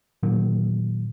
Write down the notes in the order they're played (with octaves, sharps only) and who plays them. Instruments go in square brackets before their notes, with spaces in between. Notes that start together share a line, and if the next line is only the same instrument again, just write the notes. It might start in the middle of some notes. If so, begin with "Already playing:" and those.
[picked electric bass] A#2 D#3 F#3